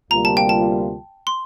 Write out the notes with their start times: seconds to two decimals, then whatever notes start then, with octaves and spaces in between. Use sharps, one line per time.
0.11 D2 C3 G3 A#3 F4 A#5
0.25 A5
0.37 G5
0.49 A5
1.27 C6